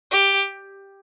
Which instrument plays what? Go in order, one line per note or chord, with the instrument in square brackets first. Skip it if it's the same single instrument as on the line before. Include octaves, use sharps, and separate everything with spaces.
[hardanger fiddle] G4